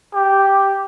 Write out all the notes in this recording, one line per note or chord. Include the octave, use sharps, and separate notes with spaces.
G4